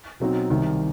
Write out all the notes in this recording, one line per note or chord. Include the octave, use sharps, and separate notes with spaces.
B2 F#3 C4 D#4 F#4
C2 C3 D#3